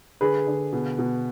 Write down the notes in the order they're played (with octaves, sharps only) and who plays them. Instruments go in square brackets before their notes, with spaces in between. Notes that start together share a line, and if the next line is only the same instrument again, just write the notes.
[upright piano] D3 G#4 B4
D3
B2
B2